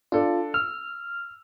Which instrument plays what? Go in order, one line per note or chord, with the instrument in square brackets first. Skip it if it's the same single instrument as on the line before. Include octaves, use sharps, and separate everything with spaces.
[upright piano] D4 A4 D5 [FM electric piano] F4
[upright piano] E6 [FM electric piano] F6